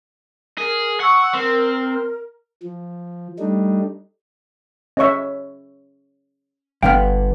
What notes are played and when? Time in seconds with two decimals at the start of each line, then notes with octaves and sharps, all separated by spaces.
0.58 G#4 A#4
1.00 F#5 C#6 E6
1.34 C4 A#4
2.63 F3
3.39 G3 A3 D4 D#4
4.97 C#4 C#5 D#5 E5 C#6
6.83 G1 G2 D3 B3 F5 G5 F6